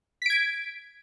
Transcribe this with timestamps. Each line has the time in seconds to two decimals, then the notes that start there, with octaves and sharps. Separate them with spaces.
0.22 B6
0.26 D7
0.30 G#6